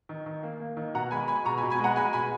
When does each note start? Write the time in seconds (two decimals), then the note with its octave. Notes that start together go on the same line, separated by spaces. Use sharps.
0.09 D#3
0.26 D#3
0.43 A#3
0.60 A#3
0.77 D#3
0.94 B2 F#5 A#5
1.11 G#3 G#5 B5
1.28 G#3 G#5 B5
1.45 B2 A#5 C#6
1.58 G#5 B5
1.63 B2
1.70 G#5 B5
1.80 G#3 F#5 A#5
1.96 G#3 G#5 B5
2.13 B2 G#5 B5